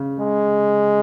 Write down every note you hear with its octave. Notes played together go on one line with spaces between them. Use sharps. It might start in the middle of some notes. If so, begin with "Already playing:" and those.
Already playing: C#3
G#3